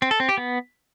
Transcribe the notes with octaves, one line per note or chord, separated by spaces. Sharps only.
C4
A4
C4
G4
B3